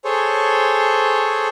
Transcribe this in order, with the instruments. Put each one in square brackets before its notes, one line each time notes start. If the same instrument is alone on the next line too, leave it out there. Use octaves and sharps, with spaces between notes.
[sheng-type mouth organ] G#4 A4 C5 C#5